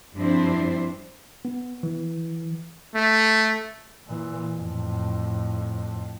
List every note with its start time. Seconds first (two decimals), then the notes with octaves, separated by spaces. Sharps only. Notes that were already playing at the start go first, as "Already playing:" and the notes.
0.15 G2 F3 C4 D4 E4 C5
1.45 B3
1.83 E3
2.95 A3
4.07 A#2 E3
4.55 F2 A2